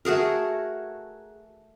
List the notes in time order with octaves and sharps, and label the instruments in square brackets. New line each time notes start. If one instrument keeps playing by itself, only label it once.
[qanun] A3 F#4 G#4 A#4